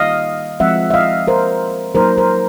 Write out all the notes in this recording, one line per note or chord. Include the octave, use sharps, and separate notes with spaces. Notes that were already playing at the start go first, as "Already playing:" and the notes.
Already playing: D#3 G3 A#3 D#5 F5
F3 G#3 C4 E5 F#5
E5
D#5 F5
A#4 C5
F#3 A#3 D#4 A#4 C5
A#4 C5